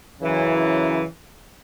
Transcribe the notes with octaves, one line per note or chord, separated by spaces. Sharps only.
F#2 C#3 E3